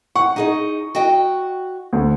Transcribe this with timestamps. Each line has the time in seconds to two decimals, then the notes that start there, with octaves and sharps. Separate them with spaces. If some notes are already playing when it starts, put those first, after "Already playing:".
0.16 F#5 C#6
0.36 D#4 G#4 D#5
0.95 F#4 D#5 G5
1.93 D2